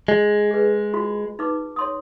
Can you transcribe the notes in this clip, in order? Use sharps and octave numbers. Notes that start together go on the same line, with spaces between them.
G#3
G#4 B4
F4 F#4
D#4 B4 D6
C#5 C6 D#6